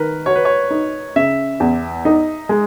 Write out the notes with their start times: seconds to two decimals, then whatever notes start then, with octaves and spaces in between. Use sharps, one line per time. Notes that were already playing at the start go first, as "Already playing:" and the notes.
Already playing: D#3 A#4 B4
0.26 F#4 C#5
0.35 B4
0.45 C#5
0.71 D#4
1.16 C#3 E5
1.60 E2
2.05 D#4
2.49 G#3